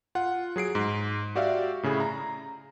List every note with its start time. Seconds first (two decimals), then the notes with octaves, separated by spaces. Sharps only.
0.15 F4 F#5
0.56 F#3 G#4 C7 D7
0.75 G#2
1.36 F#4 G4 D5 E5 F5
1.83 A2 C#3 E4 G#4
2.00 A#5